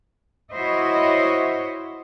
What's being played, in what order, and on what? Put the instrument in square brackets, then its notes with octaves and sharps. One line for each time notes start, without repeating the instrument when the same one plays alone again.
[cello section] E4 F#4 C5 C#5 D#5 E5